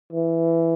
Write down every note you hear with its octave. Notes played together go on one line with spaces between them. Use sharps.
E3